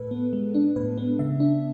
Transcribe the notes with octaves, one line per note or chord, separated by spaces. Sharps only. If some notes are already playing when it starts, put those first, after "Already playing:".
Already playing: A2 A4 B4
B3
G#3
D4
A2 B4
B3
C#3 E5
D4